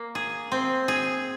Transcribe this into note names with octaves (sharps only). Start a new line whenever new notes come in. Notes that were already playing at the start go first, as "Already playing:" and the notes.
Already playing: A#3
G#4
C4
G#4